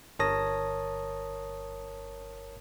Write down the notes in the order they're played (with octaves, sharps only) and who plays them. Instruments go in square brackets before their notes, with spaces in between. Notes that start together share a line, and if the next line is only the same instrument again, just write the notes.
[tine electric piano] G1 A#4 C#5 A5 D#6 A#6